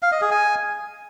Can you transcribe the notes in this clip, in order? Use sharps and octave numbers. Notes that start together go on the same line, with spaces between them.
F5
D#5
G#4
G#5